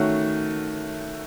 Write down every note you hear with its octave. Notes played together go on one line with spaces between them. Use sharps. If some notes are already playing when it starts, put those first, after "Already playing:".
Already playing: D#3 A3 C#4 F#4